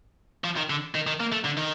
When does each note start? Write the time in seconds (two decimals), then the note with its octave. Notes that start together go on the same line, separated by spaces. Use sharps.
0.44 F3
0.57 D#3
0.70 D3
0.95 D#3
1.07 D#3
1.20 A#3
1.33 A3
1.45 D3
1.58 D#3